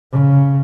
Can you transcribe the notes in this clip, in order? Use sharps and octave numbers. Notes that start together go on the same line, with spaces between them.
C#3